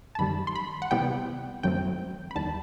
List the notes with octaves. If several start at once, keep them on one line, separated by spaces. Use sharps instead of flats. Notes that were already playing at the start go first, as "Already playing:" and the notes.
A5
F#2 D#3 G3 B5
C6
B5
F#5
C3 E3 G3 B3 G5
F#2 D#3 F#3 A3 C4 G5
B5
E2 D#3 G3 A5